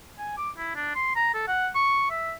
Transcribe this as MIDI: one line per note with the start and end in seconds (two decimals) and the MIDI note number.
0.19 0.37 80
0.38 0.50 86
0.58 0.74 64
0.76 0.91 62
0.95 1.13 84
1.16 1.30 82
1.34 1.46 69
1.48 1.69 78
1.75 2.07 85
2.11 2.33 76